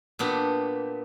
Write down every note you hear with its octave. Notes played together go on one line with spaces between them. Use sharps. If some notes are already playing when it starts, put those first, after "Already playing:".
A#2 B3 D4 G4